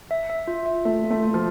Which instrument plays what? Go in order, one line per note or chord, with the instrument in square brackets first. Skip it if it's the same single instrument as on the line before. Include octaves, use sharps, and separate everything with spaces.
[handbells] E5
E5
F4
E5
[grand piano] A3 [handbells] E5
[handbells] F4
[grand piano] A3
[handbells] F4
[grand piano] F3